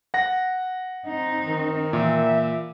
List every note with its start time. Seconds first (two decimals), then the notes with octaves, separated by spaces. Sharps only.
0.14 F#5 A#6
1.07 C4 D#4
1.45 D#3
1.93 A#2 E3 E5